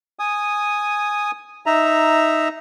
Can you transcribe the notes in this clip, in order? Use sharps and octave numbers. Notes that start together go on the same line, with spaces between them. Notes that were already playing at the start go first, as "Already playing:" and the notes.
G#5 D#6
D#4 E5 A#5